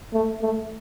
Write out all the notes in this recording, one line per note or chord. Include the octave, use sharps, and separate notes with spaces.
A3
A3